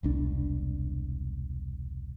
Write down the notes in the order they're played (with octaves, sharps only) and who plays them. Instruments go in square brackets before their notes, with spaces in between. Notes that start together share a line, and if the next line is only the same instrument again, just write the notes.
[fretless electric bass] E1 C2 D4